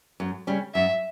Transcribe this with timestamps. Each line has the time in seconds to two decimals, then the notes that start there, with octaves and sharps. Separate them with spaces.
0.20 F#2
0.47 C#3 G3 C#4
0.74 F#2 E5